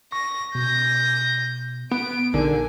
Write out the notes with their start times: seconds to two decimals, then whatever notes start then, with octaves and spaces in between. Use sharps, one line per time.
0.12 C#6 A#6
0.55 B2 G6 A#6
1.91 B3 D7
2.34 A#1 D3 D#4 A#4 G#5